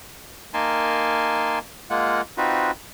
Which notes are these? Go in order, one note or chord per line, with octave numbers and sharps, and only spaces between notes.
A#3 D#4 A#4 G#5 A5 C6
G#3 A#3 F4 F#5
C4 D#4 F4 F#4 B4